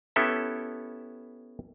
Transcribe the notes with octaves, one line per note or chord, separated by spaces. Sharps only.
B3 C#4 E4 G4 A4 E5